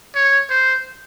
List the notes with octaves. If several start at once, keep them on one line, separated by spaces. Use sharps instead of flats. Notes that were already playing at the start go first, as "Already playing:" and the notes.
C#5
C5